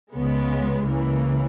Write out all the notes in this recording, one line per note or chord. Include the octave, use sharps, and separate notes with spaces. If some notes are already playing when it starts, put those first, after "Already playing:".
C#2 C#3 G#3 B3
C#2 C#3 E3 A#3